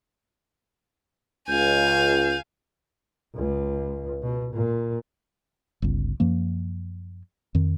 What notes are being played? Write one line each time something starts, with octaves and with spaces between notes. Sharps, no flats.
C#2 F5 G#5 G6
C#2
B2
A#2
G1 C#2
F#2 F3 A#3
F2 D#3